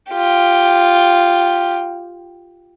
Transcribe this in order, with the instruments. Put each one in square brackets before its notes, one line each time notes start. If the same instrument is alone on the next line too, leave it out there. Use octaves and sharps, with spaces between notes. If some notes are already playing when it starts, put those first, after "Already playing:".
[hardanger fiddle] F4 G4